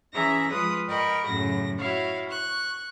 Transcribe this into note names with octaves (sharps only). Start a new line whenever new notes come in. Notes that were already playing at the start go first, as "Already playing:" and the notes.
E3 C#4 G#4 E5 A#5 A#6
F3 G#3 F4 B4 D#6
A#4 D#5 G5 B5 C#6
F#2 A2 C#3 F#3 A#6
E4 F#4 C#5 F5
C#6 F#6